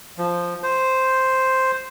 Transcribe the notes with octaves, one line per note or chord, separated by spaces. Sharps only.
F3
C5